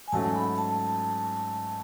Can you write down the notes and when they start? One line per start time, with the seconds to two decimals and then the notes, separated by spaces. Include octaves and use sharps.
0.08 G#5
0.12 G#2 F#3 A3 C#4 A5
0.35 B5
0.58 A5
0.80 A5